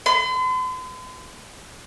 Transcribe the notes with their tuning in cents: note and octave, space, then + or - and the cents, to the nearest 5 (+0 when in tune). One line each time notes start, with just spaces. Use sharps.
C6 -45